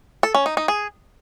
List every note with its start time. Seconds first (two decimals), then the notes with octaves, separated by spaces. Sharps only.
0.23 A4
0.35 C#4
0.46 D#4
0.57 D#4
0.68 G#4